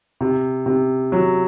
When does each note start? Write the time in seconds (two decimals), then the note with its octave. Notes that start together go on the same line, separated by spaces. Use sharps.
0.21 C3
0.66 C3
1.12 F#3